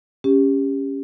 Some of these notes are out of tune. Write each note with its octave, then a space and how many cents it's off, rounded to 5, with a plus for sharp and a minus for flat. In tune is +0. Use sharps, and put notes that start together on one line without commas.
C#4 +0 G4 +20